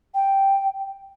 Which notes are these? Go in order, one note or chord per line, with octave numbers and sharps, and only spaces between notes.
G5